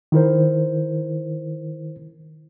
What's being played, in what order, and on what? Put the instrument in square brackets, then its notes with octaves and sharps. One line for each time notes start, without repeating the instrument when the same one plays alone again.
[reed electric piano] D#3 E4 A#4 C5